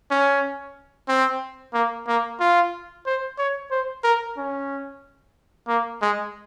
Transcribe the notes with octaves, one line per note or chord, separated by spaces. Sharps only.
C#4
C4
A#3
A#3
F4
C5
C#5
C5
A#4
C#4
A#3
G#3